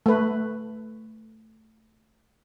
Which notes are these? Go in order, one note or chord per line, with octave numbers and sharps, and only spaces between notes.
A3 B4